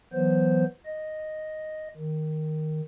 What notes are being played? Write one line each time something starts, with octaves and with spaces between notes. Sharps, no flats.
E3 F#3 B3 C5
D#5
D#3